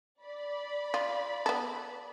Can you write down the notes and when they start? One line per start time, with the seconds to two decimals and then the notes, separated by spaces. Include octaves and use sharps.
0.23 D5 B5
0.94 F4
1.46 B3 A4